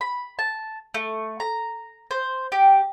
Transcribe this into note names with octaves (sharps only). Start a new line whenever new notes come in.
B5
A5
A3
A#5
C5
G4